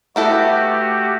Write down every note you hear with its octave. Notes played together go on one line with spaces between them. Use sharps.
A3 B3 E4 F#4 G4 A4